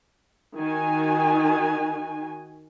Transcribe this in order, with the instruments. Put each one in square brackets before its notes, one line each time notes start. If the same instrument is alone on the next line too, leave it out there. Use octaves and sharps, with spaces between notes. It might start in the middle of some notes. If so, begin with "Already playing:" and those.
[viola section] D#3 F#4 G#5